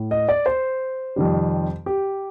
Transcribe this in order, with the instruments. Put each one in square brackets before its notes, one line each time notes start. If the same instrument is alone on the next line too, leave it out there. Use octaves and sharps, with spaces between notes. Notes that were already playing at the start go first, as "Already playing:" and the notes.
Already playing: [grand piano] A2
D#5
D5
C5
F2 C3 D#3 G3
G4